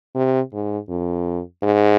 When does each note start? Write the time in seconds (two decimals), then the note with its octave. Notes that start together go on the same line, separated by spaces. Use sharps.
0.15 C3
0.53 G#2
0.89 F2
1.63 G#2